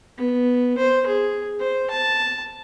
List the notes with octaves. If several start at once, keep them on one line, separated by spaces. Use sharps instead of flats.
B3
C5
G#4
C5
A5